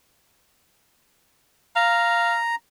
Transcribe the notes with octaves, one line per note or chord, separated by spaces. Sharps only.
F5 A#5